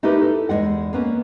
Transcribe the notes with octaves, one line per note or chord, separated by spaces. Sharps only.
A3 D#4 E4 G4 A#4 B4
A4
E2 G#2 G#3 F#5
A#3 B3 C#4